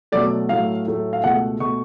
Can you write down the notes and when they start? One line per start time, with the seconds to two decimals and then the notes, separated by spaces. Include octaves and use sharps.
0.12 B2 F#3 A3 D5
0.49 A2 F#3 A3 F5
0.86 A2 F#3 A3
1.13 F5
1.24 C#2 B2 A3 F#5
1.60 B2 A3 C#6